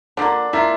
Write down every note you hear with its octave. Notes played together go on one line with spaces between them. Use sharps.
D3 F3 A#3 D4
F3 A#3 E4 F4